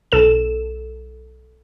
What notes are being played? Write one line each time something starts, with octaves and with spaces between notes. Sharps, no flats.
B1 A4 E7